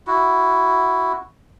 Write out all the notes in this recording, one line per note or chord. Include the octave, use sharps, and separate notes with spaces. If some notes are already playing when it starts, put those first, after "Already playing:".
E4 F#4